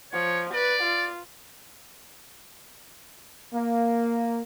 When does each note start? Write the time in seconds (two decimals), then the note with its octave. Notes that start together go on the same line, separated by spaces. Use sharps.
0.13 F3 C#5
0.54 B4 D5
0.83 F4
3.54 A#3